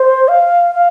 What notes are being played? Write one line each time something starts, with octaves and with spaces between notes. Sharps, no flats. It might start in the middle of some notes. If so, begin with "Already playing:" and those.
Already playing: C5
F5
F5